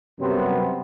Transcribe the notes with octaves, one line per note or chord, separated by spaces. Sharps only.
F#2 C3 F#3 G3 B3 C4